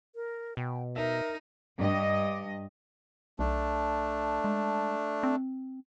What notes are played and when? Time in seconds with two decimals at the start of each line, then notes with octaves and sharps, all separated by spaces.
0.15 A#4
0.57 B2 G5
0.96 D#4 A#4 E5
1.78 G2 D#5
3.39 B1 A3 D4
4.44 G#3
5.23 C4